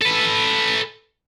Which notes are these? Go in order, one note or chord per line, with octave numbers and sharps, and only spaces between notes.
A4 B4